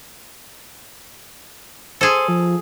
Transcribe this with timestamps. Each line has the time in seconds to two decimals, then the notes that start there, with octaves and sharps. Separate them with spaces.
2.01 G#4 A4 C5
2.28 F3